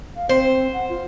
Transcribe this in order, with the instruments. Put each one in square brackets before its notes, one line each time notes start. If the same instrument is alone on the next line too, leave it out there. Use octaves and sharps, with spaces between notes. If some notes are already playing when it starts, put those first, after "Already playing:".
[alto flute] F5
[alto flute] C4 [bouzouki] C5
[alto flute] F#5
F4